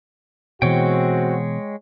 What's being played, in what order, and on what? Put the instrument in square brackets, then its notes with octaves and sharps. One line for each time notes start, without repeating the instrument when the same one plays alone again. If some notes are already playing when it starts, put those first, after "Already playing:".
[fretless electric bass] B2 E3 [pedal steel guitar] G#3 C#5 G5 [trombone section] C4 F#4